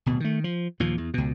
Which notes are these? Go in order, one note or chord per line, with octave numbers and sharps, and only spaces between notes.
D1 B2
D#3 A3
F3
D#2 A#2 F3
E2
C#2 B2